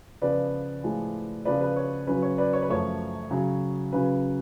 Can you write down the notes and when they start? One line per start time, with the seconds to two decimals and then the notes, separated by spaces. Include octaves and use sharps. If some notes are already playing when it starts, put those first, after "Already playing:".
0.22 C#3 F3 B3 B4 D5
0.84 A2 F3 G#3
1.45 C#3 F3 B3 B4 D5
1.61 B4
1.76 C#5
2.07 C#3 F#3 C#4 B4
2.22 C#5
2.38 B4 D5
2.53 C#5
2.62 B4
2.69 F#2 F3 A3 C#5
3.31 C#3 F#3 C#4
3.92 C#3 F#3 C#4 B4